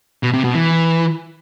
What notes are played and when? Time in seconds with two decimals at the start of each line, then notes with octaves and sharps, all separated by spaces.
0.23 B2
0.33 C3
0.44 B2
0.55 E3